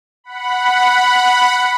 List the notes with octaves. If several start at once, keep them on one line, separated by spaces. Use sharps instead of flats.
F#5 B5